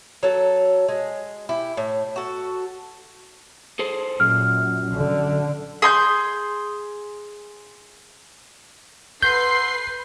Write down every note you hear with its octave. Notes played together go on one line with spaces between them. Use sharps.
F#3 A4
G#3
E4 G4
A2
F#4 A4
G#4 A4 C5
F#2 A#2 F6
D3
G#4 C6 G6
A4 B4 F#5 C6 G6 C7